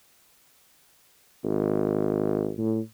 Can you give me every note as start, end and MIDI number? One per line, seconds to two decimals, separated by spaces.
1.44 2.52 32
2.58 2.79 45